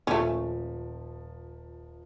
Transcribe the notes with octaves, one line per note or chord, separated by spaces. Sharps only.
D#1 F3 A3 C#4